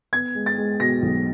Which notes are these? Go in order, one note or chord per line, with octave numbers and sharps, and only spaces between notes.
B3 G#6
G#3
A6
G#3
B2 A#6
B1